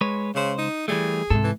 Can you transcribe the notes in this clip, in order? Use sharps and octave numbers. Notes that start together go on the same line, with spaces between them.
G#3 B4 C#5
C#2 C#3 C5
D#4
E3 G3 A3 G#4
G#2 C3 A4
E3